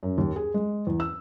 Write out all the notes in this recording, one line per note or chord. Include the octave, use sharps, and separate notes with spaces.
F#2
D#2
G#4
G#3
E2
E6